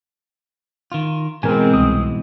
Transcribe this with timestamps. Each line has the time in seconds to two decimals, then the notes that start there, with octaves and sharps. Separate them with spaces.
0.92 D#3 F4
1.43 G#2 B2 E3 G#3 C4 A#4 G#5
1.74 C2 D#6